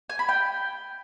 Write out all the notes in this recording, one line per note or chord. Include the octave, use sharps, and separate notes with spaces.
G#5
B5
G5